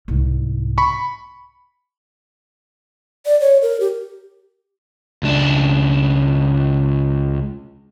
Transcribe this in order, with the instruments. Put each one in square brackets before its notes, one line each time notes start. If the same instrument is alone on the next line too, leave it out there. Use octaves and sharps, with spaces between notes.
[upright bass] C2 G#2
[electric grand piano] B5 C#6
[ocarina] D5
C#5
A#4
G4
[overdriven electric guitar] C#2 D4